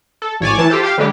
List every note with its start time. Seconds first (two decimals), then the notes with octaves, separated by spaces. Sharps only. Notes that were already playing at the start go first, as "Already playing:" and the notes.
0.22 A4
0.40 A1 C#5 D5 G#5
0.58 E3 A5
0.70 F4 G4 A4 C5
0.83 G4 F5
0.98 D3 G3 G#3 G4